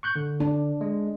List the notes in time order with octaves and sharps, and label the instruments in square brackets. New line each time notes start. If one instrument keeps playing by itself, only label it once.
[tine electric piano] C#6 F#6 G6
D3
[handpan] D4
[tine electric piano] G#3